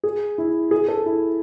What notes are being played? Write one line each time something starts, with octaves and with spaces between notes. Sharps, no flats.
G#4
E4
G#4
A4
E4